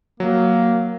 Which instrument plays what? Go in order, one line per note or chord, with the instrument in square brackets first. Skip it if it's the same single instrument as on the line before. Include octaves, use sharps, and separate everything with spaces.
[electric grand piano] F#3 [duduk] A#3